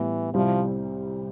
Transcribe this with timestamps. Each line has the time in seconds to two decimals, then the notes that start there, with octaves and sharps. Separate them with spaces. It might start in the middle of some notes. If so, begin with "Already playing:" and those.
Already playing: A2 E3 G3 B3
0.33 C2 C3 F3 G3 C4 E4